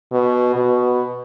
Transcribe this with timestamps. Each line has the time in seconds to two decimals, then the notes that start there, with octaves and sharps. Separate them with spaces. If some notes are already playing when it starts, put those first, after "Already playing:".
0.12 B2
0.56 B2